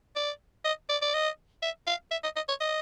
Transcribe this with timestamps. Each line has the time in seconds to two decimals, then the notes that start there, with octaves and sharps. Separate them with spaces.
0.16 D5
0.64 D#5
0.89 D5
1.02 D5
1.14 D#5
1.62 E5
1.87 F5
2.11 E5
2.23 D#5
2.36 D#5
2.48 C#5
2.60 D#5